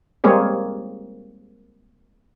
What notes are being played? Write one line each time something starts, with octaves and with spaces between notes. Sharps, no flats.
G3 G#3 A#3 C4 G#4 C#5